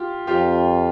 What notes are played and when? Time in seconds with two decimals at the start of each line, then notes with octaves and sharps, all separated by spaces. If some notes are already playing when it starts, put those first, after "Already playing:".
Already playing: F4 G4
0.27 F2 F4 G4